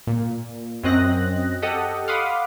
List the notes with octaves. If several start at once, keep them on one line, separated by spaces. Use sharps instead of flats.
A#2
F#2 C4 D#5 F#6 A#6
G4 A4 D#5 F#5
F5 F#5 B5 C6 D6 D#6